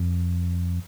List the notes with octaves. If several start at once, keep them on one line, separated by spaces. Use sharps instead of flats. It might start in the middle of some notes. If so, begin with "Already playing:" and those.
Already playing: F2